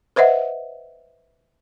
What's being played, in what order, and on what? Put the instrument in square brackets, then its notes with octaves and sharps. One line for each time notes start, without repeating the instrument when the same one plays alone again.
[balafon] B4 C5 D#5 E5 F#5